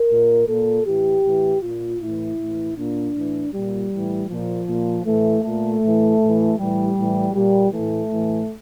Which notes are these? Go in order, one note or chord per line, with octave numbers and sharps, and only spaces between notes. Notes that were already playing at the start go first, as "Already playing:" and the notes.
Already playing: A#4
A#2
A#2 A4
A2 E3 G4
A2 E3
A#2 F4
A2 E3 E4
A2
E3
A#2 D4
A2 E3
A#2 G3
A2 E3
A#2 F3
A#2
A2 E3 A3
A#2 A3
A2 E3
A2
E3
A2 E3 G3
A2 E3
A#2 G3
A2 E3 A3
A2 E3